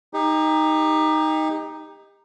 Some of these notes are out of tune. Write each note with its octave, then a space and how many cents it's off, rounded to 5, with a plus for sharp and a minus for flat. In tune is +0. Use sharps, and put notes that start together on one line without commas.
D#4 +0 G4 +30